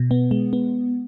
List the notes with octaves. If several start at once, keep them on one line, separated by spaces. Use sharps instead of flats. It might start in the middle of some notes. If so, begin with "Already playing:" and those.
Already playing: B2
B3
G#3
B3